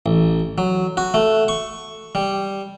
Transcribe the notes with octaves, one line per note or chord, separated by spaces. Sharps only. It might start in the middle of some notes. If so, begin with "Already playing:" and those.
A1
F#3
F#4
A3
C#6
G3